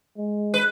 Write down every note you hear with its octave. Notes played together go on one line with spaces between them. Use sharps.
G#3
B4